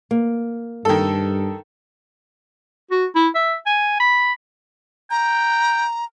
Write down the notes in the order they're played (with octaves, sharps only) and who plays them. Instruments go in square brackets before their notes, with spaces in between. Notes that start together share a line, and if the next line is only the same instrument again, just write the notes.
[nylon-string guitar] A#3
[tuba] G2 [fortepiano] D#3 A4
[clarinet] F#4
E4
E5
G#5
B5
[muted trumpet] G5 [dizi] A#5